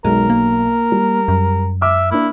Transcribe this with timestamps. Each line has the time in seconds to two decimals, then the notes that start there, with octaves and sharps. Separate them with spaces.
0.05 B1 G#3 A#4
0.30 A#3
0.92 G3
1.28 F#2
1.82 E5 D6 F6
2.11 A#3 D4 E4